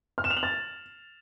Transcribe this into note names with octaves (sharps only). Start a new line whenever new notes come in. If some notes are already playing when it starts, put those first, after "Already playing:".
F6
E7
F7
F#7
A6